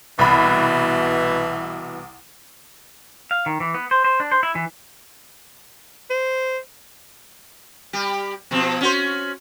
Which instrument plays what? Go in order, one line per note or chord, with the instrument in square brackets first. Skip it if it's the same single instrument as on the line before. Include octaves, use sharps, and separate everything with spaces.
[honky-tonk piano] C2 B5 [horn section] B2 E3
[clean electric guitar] F5
D#3
E3
B3
C5
C5
D4
C5
E4
E3
[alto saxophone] C5
[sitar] G3 G4
B2 F3 C4
C#4 F#4 C5